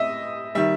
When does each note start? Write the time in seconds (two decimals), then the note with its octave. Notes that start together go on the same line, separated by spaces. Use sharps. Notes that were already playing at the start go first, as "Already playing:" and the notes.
Already playing: A2 D#5 E5
0.55 D#3 G3 E5